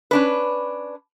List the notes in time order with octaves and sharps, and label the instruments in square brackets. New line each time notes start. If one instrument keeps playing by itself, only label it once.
[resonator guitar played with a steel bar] C#4 D4 B4